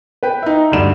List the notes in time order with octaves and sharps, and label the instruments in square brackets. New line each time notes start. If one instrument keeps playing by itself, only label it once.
[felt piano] B4 G5
D#4 E5
D2 G2 E7